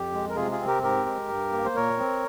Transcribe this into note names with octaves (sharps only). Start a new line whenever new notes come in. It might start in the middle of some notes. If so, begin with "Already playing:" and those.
Already playing: F2 G4
G#3
A#4
C3 F4 G#4
F4 G#4
C4
G4 A#4
G#2 G4 A#4
G#3
G2
A#3
C5
A#2 A#4 C#5
C4